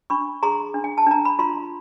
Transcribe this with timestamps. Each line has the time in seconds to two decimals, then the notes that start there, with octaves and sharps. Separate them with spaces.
0.10 D4 B5 C#6
0.43 G#4 A#5 C6
0.74 D4
0.84 G#5
0.98 A5
1.06 D4 A#5
1.25 B5
1.39 F4 A#5 C6